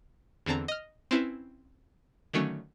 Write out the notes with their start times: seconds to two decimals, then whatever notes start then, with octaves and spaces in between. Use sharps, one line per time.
0.46 E2 D3 C4 A5 A#5
0.68 D#5 F6
1.11 C4 C#4 E4 B4
2.33 D3 D#3 F#3 A3 C#4